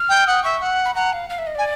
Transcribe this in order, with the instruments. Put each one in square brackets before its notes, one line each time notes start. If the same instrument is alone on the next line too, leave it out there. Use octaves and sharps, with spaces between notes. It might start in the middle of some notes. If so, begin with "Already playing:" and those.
Already playing: [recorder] F6
[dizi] G5
[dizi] F#5 [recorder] D#6
[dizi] E5 [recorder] C#6
[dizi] F#5
[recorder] B5
[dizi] F#5 [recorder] A#5
[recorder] F5
F5
E5
D#5
[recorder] D5 [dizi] G#5